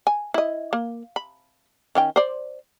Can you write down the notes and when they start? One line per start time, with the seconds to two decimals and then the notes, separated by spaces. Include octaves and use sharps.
0.07 G#5
0.34 E4 D#5
0.73 A#3
1.16 B5
1.95 D#3 C#4 G5
2.16 C5 D5